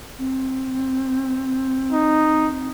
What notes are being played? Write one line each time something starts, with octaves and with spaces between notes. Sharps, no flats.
C4
D#4